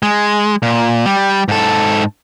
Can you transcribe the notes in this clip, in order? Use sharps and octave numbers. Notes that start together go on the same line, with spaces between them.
G#3
A#2
G3
G#2 A4